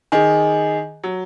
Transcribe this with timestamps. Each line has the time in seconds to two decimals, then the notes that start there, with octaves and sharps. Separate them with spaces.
0.12 D#3 G#4 D#5 G#5
1.04 F#3